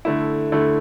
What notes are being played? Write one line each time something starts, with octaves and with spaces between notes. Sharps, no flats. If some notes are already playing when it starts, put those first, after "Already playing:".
D3 A3 E4
D3 A3 E4